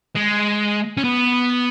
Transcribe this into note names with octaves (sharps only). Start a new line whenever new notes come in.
G#3
C#4
B3